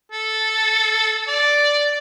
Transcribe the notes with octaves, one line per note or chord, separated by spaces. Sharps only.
A4
D5